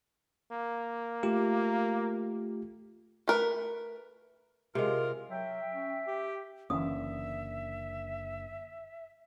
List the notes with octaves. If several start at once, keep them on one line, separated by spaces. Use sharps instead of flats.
A#3
A3 F4 G4
A3 A#4 B4
C3 G#3 F4 A#4
F#3 E5 G5
C#4
G4
F#1 D3 E3 A#3 C#4 E5 D#6